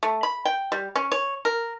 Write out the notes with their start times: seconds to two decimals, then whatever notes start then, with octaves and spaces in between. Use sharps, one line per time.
0.03 A3
0.23 B5
0.45 G5
0.72 G3
0.96 C#4
1.12 C#5
1.45 A#4